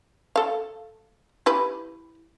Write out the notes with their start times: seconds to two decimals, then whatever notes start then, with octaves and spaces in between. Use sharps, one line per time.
0.36 A4 F5
1.46 E4 G4 B4